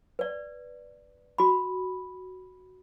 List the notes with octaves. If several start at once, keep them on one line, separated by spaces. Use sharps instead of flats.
B4 D5
F#4 B5